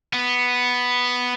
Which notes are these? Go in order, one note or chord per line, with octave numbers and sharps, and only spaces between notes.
B3